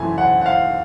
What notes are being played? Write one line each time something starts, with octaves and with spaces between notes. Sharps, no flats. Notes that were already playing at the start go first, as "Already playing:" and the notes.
Already playing: F#2 C#3 E3 A3 C4 G#5
F#5
F#5
F5